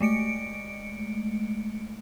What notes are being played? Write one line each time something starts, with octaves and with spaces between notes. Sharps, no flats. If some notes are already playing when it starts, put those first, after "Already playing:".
G#3 A3 C#7 D7